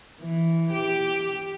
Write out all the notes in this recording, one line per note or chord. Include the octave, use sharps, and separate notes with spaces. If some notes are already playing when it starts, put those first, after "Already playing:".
E3
G4